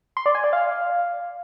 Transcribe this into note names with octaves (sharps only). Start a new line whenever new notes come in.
C6
D5
G#5
D5
F5